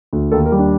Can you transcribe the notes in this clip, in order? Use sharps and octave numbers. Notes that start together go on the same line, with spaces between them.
D2
D#2 A4
A#4
G3
D4